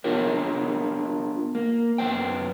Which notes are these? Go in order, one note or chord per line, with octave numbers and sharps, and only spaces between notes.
B3 D4 F4 G4 A#4 C#5
A#3
F#2 B3 C5 G5